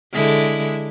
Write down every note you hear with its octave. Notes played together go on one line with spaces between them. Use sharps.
D3 G#3 E4